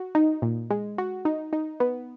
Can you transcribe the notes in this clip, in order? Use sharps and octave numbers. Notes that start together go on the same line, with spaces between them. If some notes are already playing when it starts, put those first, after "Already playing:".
Already playing: F#4
D#4
A#2
G#3
F#4
D#4
D#4
B3